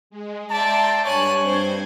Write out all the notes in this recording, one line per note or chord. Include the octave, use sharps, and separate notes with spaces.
G#3
D5 E5 G5 A5 A#5 C6
G2 C#5 G#5 F#6
G2 C4 C5 G#6